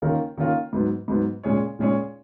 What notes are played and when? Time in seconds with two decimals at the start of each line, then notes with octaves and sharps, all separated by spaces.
0.02 D#3 A#3 C#4 F4 A#4
0.38 D#3 A#3 C#4 F4 A#4
0.73 G#2 F#3 B3
1.08 G#2 F#3 B3
1.43 A#2 G#3 C#4 G#4 C#5
1.79 A#2 G#3 C#4 G#4 C#5